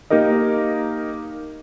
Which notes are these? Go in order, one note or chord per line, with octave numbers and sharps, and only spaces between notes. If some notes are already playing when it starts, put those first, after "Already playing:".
A#3 D#4 G4 A#4 D#5